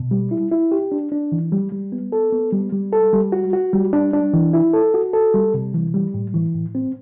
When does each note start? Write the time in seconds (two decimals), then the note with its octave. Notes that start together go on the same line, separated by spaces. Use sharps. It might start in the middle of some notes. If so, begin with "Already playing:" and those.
Already playing: B2
0.11 G3
0.31 E4
0.51 E4
0.72 G4
0.92 D4
1.12 D4
1.32 E3
1.52 G3
1.72 G3
1.92 B3
2.12 A4
2.32 B3
2.53 G3
2.73 G3
2.93 A4
3.13 G3
3.32 F#4
3.53 F#4
3.73 G3
3.93 D4
4.13 D4
4.34 E3
4.53 E4
4.73 A4
4.94 F#4
5.13 A4
5.34 G3
5.54 C3
5.74 E3
5.94 G3
6.14 A2
6.34 E3
6.55 A2
6.75 C4